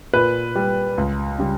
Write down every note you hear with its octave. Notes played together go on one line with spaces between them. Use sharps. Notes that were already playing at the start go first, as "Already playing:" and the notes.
A#2 B4
G3
C#2
C#3 G3